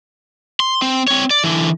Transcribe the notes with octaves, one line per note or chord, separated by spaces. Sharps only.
C6
C4
C4 C#5
D5
D3 E3